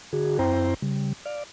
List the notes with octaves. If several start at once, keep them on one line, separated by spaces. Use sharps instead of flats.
D3 F#4 G#4
F#2 C4 E4 C5 G5 A#5
C#3 G3
D5 F5